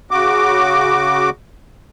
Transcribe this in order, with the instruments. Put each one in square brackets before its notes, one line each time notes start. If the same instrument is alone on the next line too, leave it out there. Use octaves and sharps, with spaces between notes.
[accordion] C#3 F#4 D6